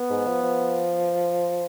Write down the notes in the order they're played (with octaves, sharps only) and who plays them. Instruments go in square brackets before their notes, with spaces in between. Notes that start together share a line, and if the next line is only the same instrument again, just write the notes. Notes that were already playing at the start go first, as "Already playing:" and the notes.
Already playing: [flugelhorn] B3
[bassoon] G#2
F3
F3